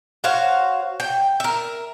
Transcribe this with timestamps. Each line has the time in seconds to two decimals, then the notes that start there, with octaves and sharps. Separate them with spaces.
0.24 F#4 C5 C#5 F5
1.00 G5
1.40 A#4 E5